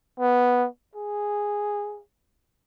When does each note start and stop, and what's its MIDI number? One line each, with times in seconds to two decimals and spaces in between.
0.20 0.68 59
0.95 2.01 68